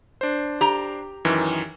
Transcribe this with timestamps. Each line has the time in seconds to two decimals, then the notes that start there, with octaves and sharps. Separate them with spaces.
0.21 D4 C5
0.61 G4 A#5
1.25 F#2 D#3 E3